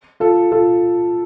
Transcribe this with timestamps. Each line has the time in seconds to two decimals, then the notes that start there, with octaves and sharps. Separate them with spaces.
0.20 F4 A4
0.52 F4 A4